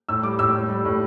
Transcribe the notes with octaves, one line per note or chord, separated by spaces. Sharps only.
A2 E6
G3 D6
A2 E6
A2
G3
A2